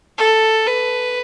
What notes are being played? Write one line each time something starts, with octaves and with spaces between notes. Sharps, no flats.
A4
B4